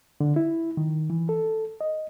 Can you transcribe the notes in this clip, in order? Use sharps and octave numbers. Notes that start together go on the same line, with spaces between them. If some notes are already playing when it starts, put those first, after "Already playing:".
D3
E4
D#3
E3
A4
D#5